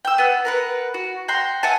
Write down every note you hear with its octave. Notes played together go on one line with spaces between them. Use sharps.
G5 E6
B3 F#5
A#4 B4 F#5
F#4
F#5 G5 A#5 C6
E5 F#5 G#5 A5